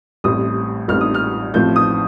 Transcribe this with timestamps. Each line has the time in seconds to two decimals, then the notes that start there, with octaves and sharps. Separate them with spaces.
0.24 A1 A2 G3 C4 D#6
0.88 A1 A2 G3 C4 F6
1.01 D#6
1.14 F6
1.54 A1 A2 F3 C4 G6
1.76 D#6